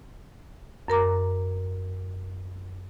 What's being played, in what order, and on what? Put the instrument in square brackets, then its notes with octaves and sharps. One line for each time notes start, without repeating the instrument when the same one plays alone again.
[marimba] F#2 A#4 A#5 D6